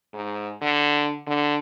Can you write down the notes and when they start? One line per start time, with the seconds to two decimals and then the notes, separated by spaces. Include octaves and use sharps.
0.14 G#2
0.61 D3
1.27 D3